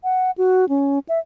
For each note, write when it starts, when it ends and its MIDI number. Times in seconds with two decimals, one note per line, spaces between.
0.04 0.31 78
0.38 0.69 66
0.69 0.99 61
1.09 1.19 76